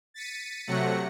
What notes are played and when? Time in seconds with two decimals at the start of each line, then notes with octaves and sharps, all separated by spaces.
0.14 A6 B6 C#7 D#7
0.67 C3 F#3 A3 F#5 A#6 C#7